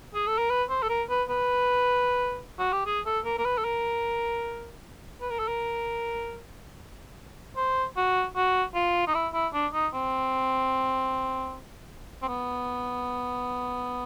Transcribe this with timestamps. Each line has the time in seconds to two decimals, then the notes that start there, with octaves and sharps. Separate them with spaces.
0.14 G#4
0.27 A4
0.38 A#4
0.50 B4
0.69 C5
0.82 A4
0.89 A#4
1.09 B4
1.29 B4
2.59 F#4
2.72 G4
2.86 G#4
3.06 A4
3.25 A#4
3.38 A#4
3.45 B4
3.58 A4
3.64 A#4
5.21 B4
5.30 A#4
5.39 A4
5.48 A#4
7.56 C5
7.97 F#4
8.36 F#4
8.74 F4
9.07 D#4
9.14 E4
9.33 E4
9.53 D4
9.73 D#4
9.93 C4
12.22 C4
12.28 B3